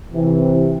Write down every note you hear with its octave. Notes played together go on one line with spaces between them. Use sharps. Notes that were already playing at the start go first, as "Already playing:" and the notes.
C3 E3